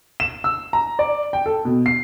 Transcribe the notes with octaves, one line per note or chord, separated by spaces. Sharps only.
E7
E6
A#5
D5
G5
A4
B2
C7